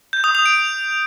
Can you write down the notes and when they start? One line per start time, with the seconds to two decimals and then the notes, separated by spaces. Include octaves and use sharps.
0.13 G6
0.24 D#6
0.35 F7
0.46 D7